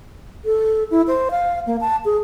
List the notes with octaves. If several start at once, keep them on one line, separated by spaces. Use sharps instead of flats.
A4
E4
C5
F5
A#3
A5
G#4